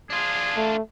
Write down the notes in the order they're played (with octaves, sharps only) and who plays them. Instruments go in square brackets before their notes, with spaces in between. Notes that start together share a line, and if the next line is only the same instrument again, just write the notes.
[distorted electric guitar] D4 F4 [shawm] G#4
[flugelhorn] A3